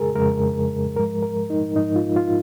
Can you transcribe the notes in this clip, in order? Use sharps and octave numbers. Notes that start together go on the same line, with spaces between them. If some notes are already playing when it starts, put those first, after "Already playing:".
Already playing: F2 C#3 G#3 G#4 A#4
F2 C#3 G#3 A#4
G#2 F3 G#3 A#4
A#4
D#4
G#2 F3 G#3 D#4
F4
F4